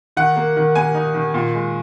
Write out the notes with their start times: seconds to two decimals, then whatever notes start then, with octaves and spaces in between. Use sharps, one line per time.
0.16 D#3 F#5
0.36 A#3
0.57 D#3
0.75 A#3 G#5
0.95 D#4
1.14 D#3
1.34 A#2
1.54 G#3